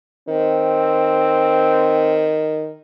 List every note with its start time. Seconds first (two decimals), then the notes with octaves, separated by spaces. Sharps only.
0.29 D#3 C4